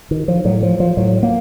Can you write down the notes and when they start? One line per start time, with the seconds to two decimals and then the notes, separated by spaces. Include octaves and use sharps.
0.11 D#3
0.28 F3
0.45 A2 F#3
0.63 F3
0.80 F3
0.97 A2 F#3
1.23 A#3